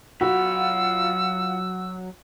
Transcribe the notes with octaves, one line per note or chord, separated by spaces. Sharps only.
F#3 F4 F#4 F#5 B5 E6